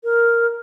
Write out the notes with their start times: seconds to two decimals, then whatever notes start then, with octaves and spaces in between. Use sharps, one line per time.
0.04 A#4